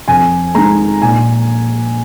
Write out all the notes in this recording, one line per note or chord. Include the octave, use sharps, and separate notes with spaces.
F2 G#5
D#3 G#3 A#5
A#2 G#5